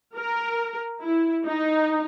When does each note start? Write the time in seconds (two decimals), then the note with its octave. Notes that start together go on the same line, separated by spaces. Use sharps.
0.17 A#4
1.02 E4
1.45 D#4